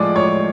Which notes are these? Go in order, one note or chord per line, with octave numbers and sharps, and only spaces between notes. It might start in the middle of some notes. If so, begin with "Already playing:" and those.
Already playing: A2 F3 G#3 D5 D6
C#5 C#6